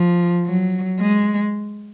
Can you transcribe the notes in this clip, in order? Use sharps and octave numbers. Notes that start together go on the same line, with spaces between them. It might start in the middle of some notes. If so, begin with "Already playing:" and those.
Already playing: F3
F#3
G#3